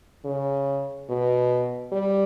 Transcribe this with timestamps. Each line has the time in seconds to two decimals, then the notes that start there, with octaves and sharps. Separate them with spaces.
0.25 C#3
1.09 B2
1.92 G3